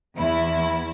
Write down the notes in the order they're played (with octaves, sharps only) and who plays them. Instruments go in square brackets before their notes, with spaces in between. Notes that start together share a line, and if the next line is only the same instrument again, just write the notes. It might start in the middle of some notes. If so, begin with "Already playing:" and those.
[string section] E2 E4